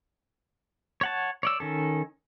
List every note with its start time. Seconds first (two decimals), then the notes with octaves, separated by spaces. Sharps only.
1.01 C#5 F#5 A5
1.43 C#5 D5 E6
1.60 D#3 C#4 A4